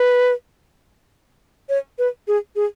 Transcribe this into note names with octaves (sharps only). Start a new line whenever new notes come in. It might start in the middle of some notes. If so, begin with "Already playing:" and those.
Already playing: B4
C#5
B4
G#4
G#4